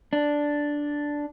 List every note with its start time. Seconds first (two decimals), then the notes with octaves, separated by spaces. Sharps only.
0.13 D4